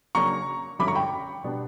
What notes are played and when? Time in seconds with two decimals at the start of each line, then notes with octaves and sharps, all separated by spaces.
0.15 C#3 F#3 A#3 D4 A#5 C#6
0.79 G2 D3 F#3 C#4 E4 B5 D6
0.88 A#5 C#6
0.95 G5 B5
1.44 B2 G3 B3 D4